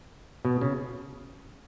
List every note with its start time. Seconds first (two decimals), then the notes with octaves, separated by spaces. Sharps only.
0.45 B2
0.61 C#3